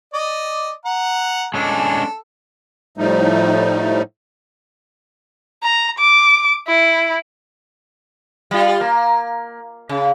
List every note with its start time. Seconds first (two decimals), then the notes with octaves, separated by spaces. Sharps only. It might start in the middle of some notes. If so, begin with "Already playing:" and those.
0.14 D5 D#5
0.85 F#5 A#5
1.54 G#3 C#4 D4 A4
2.98 A2 F3 G3 A3 D#4
5.63 A#5
5.99 D6
6.67 E4
8.51 G3 F4
8.81 A#3
9.89 C#3